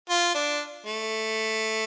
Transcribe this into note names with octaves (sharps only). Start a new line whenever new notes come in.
F4
D4
A3